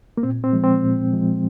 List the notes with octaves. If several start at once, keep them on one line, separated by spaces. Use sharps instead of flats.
A#3
A#2 C4
C4
F3 G#3
C4
A#2
F3 G#3